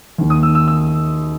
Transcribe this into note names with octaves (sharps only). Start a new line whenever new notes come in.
D#2 D#3 A#3
D#6
E6
E6
E6